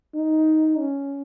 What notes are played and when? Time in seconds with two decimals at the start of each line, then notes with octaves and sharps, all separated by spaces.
0.14 D#4
0.78 C#4